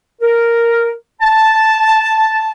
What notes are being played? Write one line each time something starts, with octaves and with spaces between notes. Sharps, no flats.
A#4
A5